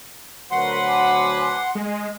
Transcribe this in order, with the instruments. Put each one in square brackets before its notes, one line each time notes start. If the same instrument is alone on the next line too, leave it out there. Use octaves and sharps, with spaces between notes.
[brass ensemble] D2 F#3 B4 [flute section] A#4 C#6 [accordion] F#5 C6
[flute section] G#5 A5 D6
[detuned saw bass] G#3 [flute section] G#5